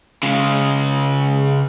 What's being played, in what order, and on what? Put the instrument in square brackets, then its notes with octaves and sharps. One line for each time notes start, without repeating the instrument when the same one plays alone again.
[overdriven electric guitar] C#3 G#3